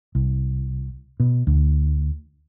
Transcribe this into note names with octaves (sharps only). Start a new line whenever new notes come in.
C2
B2
D2